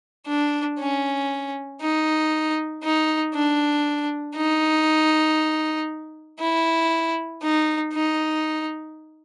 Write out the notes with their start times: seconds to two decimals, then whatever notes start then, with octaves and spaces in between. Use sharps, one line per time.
0.28 D4
0.79 C#4
1.82 D#4
2.84 D#4
3.35 D4
4.37 D#4
6.40 E4
7.43 D#4
7.94 D#4